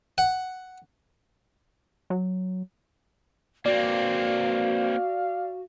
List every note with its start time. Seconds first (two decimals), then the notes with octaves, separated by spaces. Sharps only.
0.18 F#5
2.10 F#3
3.66 A#3 C4 F#4 D5 F5